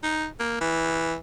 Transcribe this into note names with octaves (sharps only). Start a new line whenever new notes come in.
D#4
A#3
E3